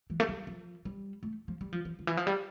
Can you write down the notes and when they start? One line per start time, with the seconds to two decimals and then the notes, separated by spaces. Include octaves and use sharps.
0.10 E3
0.20 A3
0.29 G3
0.47 F3
0.85 G3
1.23 A3
1.48 F3
1.61 G3
1.72 F3
1.85 E3
1.99 D3
2.07 E3
2.17 F3
2.27 G3